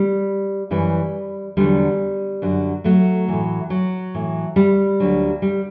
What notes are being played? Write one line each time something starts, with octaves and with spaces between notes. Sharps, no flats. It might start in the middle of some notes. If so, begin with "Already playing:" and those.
Already playing: G3
F#2 E3 G3
E2 D3 F#3 G3
F#2 D3 F#3
F#3 A3
A2 E3
F#3
A2 E3
G3
D2 D3 F#3
G3